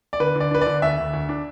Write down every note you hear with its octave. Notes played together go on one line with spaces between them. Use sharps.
D5
D3 B4
D3 D5
D4 B4
D5
D3
D2 E5
D2
D2
D4